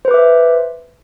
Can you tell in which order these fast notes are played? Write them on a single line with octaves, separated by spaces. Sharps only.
C5 B4 D6 E5